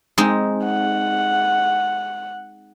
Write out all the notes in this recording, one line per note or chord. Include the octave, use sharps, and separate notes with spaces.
G#3 C4 D#4
F#5